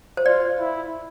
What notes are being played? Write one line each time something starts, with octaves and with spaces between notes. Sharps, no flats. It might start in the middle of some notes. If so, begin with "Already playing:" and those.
C5
F4 D5
E4